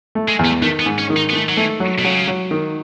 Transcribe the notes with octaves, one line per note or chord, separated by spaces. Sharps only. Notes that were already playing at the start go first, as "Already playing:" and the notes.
A3
G#3
E2
A3
D#3 A3
B3
G#2
C#4
D#3
D#4
B3
D#3 A3
F#3
E3 A3
F#3
B2
C#3 F#3
F#3
D#3